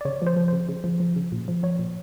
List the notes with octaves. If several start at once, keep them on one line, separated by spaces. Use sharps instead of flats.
D5
C#3 C#5
F3 C5
F3
C#3 C5
C#3
F3
F3
C#3
A#2
F3
F3 C#5
A#2